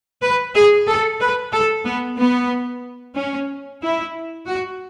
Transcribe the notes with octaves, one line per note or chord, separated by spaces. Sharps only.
B4
G#4
A4
B4
A4
B3
B3
C#4
E4
F#4